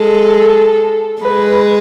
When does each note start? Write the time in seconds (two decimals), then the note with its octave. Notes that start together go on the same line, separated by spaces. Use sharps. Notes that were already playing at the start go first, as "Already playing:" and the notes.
Already playing: G#3 A4
1.22 G#3 B4